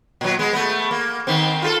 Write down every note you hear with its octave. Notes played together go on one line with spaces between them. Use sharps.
A#2 F#3
G#3 B3
A3 B3
A#3
D#3 B3 C4
F4 G4 A4